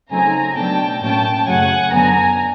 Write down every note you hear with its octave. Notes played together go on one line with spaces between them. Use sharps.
C#3 F#3 A3 C4 D#4 G#5 A#5
B2 F#3 A3 D4 G5 A5
A2 F#3 A#3 C#4 G5 A5
F#2 C#3 F#3 A3 F#5 G#5
F#2 D3 F#3 B3 G#5 A#5